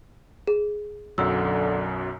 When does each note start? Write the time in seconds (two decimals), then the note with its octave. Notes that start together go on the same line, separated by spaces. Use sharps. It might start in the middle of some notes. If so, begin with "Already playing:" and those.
0.47 G#4
1.18 B1 F#2 D3 F#3 E6